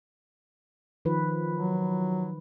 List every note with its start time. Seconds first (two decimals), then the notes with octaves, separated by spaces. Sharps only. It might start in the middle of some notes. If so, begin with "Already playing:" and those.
1.05 D#3 F3 B4
1.52 F#3